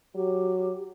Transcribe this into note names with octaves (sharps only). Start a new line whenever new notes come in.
F#3 G4